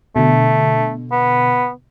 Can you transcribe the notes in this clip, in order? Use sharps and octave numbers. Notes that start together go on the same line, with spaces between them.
B2 D3 A3
B3